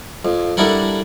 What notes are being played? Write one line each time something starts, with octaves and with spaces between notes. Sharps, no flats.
F2
G3 D4 E4 A4 A#4 F#5